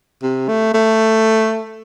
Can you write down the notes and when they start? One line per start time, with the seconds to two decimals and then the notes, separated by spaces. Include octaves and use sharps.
0.23 C3
0.48 A3
0.74 A3